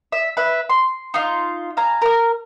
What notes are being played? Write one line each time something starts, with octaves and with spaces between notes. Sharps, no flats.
E5
B4 E5
C6
D#4 F4
F5 G#5 A#5
A#4 F6